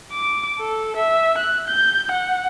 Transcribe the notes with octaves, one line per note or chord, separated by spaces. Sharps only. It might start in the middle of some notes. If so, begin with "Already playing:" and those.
D6
A4
E5
F#6
G6
F#5